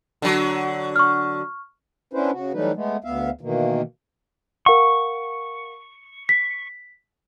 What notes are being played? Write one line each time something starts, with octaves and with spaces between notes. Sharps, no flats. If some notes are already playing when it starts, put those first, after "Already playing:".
D3 F#3
C#6 F6
B3 C#4 D4 E4 B4 C5
C#3 F#4
E3 F#3 G3 A3 D#4 B4
G#3 A3 B3
D2 B3 E5 F5
B2 D#3 E3 A#3
A#4 F5 F#5 C#6
B6